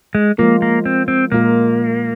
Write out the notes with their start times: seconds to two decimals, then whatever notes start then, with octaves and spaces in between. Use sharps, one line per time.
0.15 G#3
0.38 F3 G#3 A#3 F4 A#4
0.62 A#3
0.86 C4
1.08 C4
1.32 A#2 G#3 A#3 F4 A#4